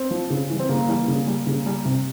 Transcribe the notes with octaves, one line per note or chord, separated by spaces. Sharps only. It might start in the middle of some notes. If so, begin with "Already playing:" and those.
Already playing: C4
F3
C#3
E3 G3
C4
C#3 A#3
E3 G3
C#3
G3
C#3
G3
C3